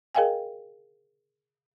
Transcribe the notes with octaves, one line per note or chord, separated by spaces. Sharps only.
G#4 A#4 D#5 F5 G5 G#5